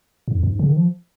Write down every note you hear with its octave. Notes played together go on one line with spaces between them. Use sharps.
G#2
F2
F#2
G#2
C#3
D#3
F3